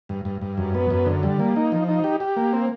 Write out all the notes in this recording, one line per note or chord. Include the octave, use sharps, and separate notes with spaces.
G2
G2
G2
F#2
B3
F#2
D3
G3
A#3
D#4
F3
D#4
G4
G4
A#3
C4